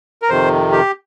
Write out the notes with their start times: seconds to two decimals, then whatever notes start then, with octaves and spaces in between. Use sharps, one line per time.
0.22 A#4
0.29 F2 C3 D#3 C5
0.72 G4